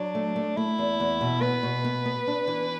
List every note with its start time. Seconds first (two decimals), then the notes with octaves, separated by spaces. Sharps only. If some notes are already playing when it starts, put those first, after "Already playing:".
Already playing: F#3 D4
0.15 A3
0.36 A3
0.57 A3 E4
0.78 E2
1.00 E2
1.21 B2
1.41 B3 B4
1.63 B2
1.84 B3
2.06 B3
2.27 D4
2.47 E3